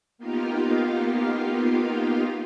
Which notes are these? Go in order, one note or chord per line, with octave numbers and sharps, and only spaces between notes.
A#3 B3 D#4 F4 G4 F5